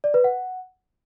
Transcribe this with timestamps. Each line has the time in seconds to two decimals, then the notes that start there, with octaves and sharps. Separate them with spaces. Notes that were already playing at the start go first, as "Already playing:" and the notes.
0.04 D5
0.14 B4
0.24 F#5